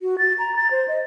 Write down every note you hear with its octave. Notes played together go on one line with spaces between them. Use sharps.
F#4
A6
A#5
A6
C5
D#5